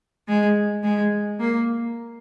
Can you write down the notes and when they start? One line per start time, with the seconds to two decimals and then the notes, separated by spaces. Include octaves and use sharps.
0.28 G#3
0.83 G#3
1.40 A#3